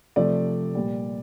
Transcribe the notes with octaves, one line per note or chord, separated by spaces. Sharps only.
C3 F3 A3 D5
A#2 G3